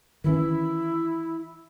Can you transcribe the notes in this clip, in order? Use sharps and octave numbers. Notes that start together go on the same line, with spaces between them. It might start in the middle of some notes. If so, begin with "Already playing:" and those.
D#3 E3 C#4 E4